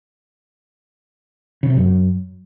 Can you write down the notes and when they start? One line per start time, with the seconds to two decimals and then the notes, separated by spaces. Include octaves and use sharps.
1.63 C#3
1.70 C3
1.77 F#2